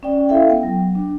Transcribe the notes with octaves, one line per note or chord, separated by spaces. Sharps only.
C#4 D5 G5
E4 A4 E5 F5 G5
B3 G5
F#3
D4